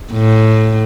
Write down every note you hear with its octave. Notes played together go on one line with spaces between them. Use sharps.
A2